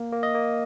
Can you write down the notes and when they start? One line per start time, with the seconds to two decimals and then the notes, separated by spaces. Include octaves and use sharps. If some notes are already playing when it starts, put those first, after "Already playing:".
Already playing: A#3
0.12 A#3
0.23 D#5
0.34 A#3